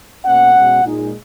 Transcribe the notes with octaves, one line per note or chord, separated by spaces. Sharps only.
B2 A#3 C#4 F#5
B2 G#3 C#4
A#2 G#3 D#4